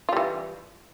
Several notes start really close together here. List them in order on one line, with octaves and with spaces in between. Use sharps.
F4 G3 E3